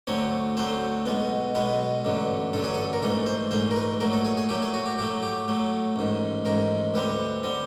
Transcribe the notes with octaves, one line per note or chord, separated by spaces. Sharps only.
D2 D3 F#3 A3 C4 C#5
D2 D3 F#3 A3 C4 C5
B1 B2 G#3 B3
B1 B2 G#3 B3 B4
A1 G2 D3 F#3
A1 G2 D3 F#3 A4
G#4
A4
A#4
A#1 G#2 E3 A3 A4
C5
A#1 G#2 E3 A3 C5
A#4
B4
A#1 A2 F#3 A3 A#4
A4
G#4
G#4
A#1 A2 F#3 A3 G4
G#4
F#4
G4
A2 F#3 A3 G4
G4
A2 F#3 A3
A1 G#2 D#3
A1 G#2 D#3 A#4
D2 D3 G3 C4 B4
D3 G3 C4